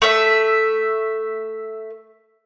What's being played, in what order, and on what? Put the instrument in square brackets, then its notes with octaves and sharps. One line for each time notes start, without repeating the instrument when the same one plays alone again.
[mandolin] A3 E5